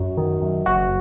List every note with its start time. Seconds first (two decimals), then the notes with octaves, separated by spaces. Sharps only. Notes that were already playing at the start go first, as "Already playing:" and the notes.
Already playing: F#2 F#4
0.17 D#3
0.41 F#2
0.66 F#1 F#4